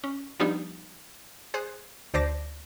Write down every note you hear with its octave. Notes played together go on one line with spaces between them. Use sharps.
C#4
F3 G3 B3 D4 D#4
G#4 C5 D#6 F#6
D2 C5 D5 A5 D6 A#6